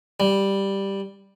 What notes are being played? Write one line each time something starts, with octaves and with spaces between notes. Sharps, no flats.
G3